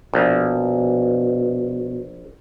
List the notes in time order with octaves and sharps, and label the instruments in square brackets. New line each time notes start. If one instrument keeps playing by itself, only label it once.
[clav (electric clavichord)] A#1 [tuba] B2